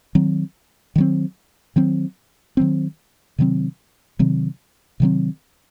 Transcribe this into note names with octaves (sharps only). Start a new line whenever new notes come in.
D#3 F#3 C4
D#3 F#3 C4
D#3 F#3 C4
D#3 F#3 C4
C3 D#3 F#3 C4
C3 D#3 F#3 C4
C3 D#3 F#3 C4